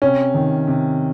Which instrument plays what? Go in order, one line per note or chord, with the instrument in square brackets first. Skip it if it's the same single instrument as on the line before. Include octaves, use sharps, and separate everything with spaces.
[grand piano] C3 [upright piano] C#4
[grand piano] D#3
C3